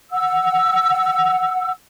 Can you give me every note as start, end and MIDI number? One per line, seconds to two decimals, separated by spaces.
0.11 1.70 78
0.11 1.70 88